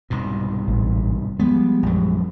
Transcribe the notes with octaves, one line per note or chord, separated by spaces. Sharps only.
C2 G#2 B2
A1
F3 G3 G#3 B3
A#1 F#2